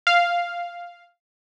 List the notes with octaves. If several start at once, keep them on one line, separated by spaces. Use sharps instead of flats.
F5